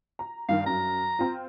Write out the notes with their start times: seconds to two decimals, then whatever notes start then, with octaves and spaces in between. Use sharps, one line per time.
0.19 A#5
0.49 G2 D#3 F5
0.66 F#2 A#5
1.19 C4 F4